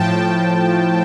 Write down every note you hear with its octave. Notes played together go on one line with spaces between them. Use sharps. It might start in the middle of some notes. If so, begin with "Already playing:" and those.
Already playing: A2 F3 G5 A5